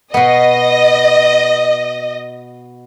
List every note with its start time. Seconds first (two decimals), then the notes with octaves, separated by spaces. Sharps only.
0.14 B2 B3 D#5